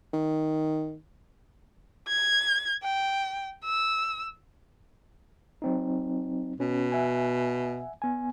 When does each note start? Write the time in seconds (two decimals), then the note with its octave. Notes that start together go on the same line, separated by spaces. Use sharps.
0.13 D#3
2.08 G#6
2.83 G5
3.64 E6
5.62 F#3 C4 D#4
6.60 B2 C#4
6.92 E5 F#5 G#5
8.02 B3 G#5